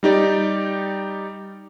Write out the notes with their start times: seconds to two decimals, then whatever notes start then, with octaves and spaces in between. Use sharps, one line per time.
0.03 G3 D#4 G4 D5